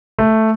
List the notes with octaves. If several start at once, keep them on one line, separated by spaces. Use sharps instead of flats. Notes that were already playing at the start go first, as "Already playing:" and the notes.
A3